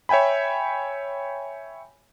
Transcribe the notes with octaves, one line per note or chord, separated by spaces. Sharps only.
C#5 E5 G5 G#5 B5